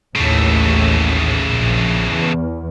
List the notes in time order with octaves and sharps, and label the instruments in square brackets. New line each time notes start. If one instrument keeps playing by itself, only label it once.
[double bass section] A1 D#2 A2 [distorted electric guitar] C#3 A3
[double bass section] A#1
E2